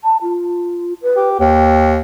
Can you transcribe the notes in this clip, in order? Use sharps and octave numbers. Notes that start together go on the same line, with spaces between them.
A5
F4
B4
G4
D#2 G5